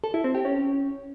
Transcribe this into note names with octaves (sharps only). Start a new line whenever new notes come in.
A4
E4
C4
G4
C#4